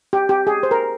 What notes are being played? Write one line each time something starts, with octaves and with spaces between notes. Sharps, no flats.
G4
G4
G#4
C5
A#4